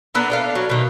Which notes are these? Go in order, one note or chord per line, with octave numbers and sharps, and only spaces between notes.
B3 D4 A4 A#4
D4 A4 F5
F#3
B2 D#3